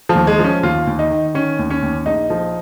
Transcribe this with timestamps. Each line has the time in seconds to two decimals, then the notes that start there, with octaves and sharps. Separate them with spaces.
0.09 F3
0.15 D#2
0.27 G#3
0.39 F3
0.44 C#4
0.63 D#2 F4
0.87 D#2
0.99 D#4
1.11 D#3
1.34 D#3 C#4
1.59 D#2
1.70 C#4
1.82 D#2
2.06 A#1 D#4
2.30 F3